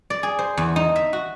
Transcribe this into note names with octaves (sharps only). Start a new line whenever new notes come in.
D5
G#4
C5
E2
D#4
E5
F#4